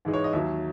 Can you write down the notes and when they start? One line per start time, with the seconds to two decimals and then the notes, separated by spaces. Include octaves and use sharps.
0.05 G#2 E3 G#3 D#4
0.14 C#5
0.24 D#5
0.33 D#2 D#3 F#3 E5